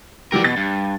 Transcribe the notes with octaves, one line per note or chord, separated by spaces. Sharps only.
E3 F#3 G4 A#4 D5
B2 A6
G2